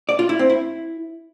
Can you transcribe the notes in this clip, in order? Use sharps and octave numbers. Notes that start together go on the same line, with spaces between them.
D5
F4
E4
C4
E4